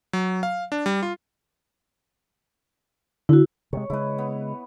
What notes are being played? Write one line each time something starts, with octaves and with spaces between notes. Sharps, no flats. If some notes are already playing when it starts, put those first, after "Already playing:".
F#3
F5
D4
G3
F4
D3 E4 F#4
C3 E3 G#3 C#5
C#3 G#3 E4 B4
B3